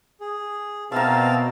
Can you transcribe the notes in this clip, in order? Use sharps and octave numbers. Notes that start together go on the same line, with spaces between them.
G#4
B2 C4 A#4 E5 F5 A5